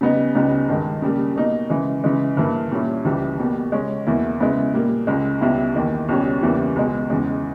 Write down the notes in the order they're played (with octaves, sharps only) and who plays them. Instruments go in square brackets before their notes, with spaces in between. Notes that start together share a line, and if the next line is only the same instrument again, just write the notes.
[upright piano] C#3 G3 B3 D#4
C#2 C#3 G3 B3 D#4
G2 D#3 G#3
C#3 G3 A#3
B2 A#3 D#4
C#3 E3 G#3
C#3 E3 G#3
G2 E3 A#3
A#2 G3 C#4 E4
C#2 C#3 E3 G3
B2 G3 A#3
C#3 G#3 C#4
E2 B2 A#3 E4
C#3 G#3 B3 E4
A#2 G3 A#3
C#2 C#3 G#3
C#2 B2 G3 B3 E4
E2 D#3 A#3
C#2 B2 G3 C#4
E2 C#3 E3 G3 A#3
C#2 B2 G#3
E2 C#3 G#3